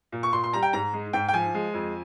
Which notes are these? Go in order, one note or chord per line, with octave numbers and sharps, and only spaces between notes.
A#2
C#6
A#2 C6
C6
G3 A#5
G5
G#2 A#5
G#3
G#2 G5
G5
F3 G#5
G#3
F2